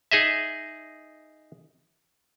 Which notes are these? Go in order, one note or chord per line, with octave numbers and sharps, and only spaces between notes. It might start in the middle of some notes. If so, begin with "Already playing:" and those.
D#4 G#4 D#5 E5